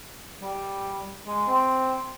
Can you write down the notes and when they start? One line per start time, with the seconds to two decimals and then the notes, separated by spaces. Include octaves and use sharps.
0.41 G3
1.26 G#3
1.48 C4